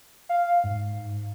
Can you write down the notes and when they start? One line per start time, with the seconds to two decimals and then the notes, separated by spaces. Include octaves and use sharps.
0.29 F5
0.64 G#2